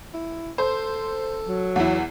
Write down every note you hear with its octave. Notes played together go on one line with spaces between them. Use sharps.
E4
A4 C5
F#3
E2 E4